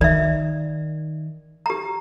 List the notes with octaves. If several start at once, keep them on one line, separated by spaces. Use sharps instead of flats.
D#3 D5 E5
G4 A#5